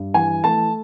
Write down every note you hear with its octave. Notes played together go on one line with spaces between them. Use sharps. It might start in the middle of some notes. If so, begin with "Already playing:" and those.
Already playing: G2
E3 G#5
A3 A5